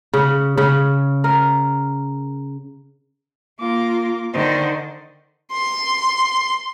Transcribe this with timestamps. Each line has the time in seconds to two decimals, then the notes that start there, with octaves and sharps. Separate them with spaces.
0.14 C#3
0.57 C#3
1.24 A#4
3.60 A#3 F4 D6
4.33 D3 D#3 C5
5.52 C6